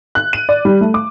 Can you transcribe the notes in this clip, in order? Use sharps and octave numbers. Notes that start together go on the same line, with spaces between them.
F#6
D#7
D5
G3
A3
D6